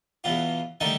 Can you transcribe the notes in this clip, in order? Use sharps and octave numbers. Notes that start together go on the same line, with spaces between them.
E2 B2 F4
D3 D#3 G3 A3 D#4